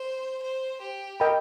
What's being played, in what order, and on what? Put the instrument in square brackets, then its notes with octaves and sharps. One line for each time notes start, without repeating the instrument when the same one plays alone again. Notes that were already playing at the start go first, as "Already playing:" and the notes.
Already playing: [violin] C5
C5
G4
[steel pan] A#4 D#5 G5 B5